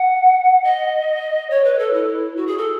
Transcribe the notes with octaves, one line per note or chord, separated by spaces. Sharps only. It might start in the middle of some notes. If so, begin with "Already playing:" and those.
Already playing: F#5
D#5
C#5
B4
A4
E4
F#4
G#4
A4